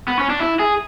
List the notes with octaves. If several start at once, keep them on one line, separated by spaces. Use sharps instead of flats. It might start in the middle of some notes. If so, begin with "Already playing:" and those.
B3
C#4
D4
E4
G#4